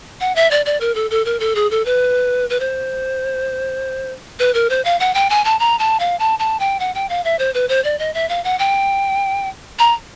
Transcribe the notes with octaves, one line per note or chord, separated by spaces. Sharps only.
F#5
E5
D5
D5
A#4
A4
A4
A#4
A4
G#4
A4
B4
B4
C5
B4
A#4
C5
F5
F#5
G5
G#5
A5
A#5
A5
F5
A5
A5
G5
F#5
G5
F5
E5
C5
B4
C5
D5
D#5
E5
F5
F#5
G5
A#5